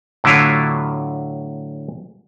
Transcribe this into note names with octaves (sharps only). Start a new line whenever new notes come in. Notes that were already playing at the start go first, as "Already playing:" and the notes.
A2 D3 F#3 E4 F4